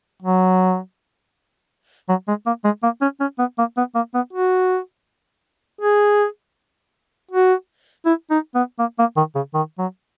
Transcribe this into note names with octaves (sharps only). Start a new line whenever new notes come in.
F#3
F#3
G#3
A#3
G#3
A#3
C#4
C#4
B3
A#3
B3
A#3
B3
F#4
G#4
F#4
E4
D#4
B3
A#3
A#3
D#3
C#3
D#3
F#3